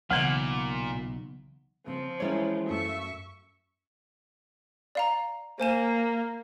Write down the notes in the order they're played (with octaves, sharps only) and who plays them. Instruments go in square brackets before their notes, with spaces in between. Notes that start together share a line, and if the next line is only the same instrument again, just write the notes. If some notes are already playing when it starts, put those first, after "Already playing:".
[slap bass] B1 [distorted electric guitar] A#2 [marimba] C#3 E3 [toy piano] F#5
[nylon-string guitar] C#3 C4 [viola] F3
[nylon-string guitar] E3 G#3 A#4 [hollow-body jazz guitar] C#4 E4 C#5
[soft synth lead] F#2 [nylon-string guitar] A3 F4 [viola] E5 C#6
[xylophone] D5 F5 A#5
[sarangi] A#3 [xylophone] C5 G#5 E7